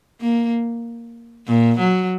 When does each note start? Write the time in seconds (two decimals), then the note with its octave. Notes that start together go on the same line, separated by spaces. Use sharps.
0.21 A#3
1.47 A#2
1.78 F#3